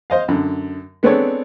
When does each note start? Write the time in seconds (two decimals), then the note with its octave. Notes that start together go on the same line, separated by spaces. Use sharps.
0.10 C5 D#5 F5
0.28 F#2 D3
1.03 G#3 B3 C4 D4 A4 C#5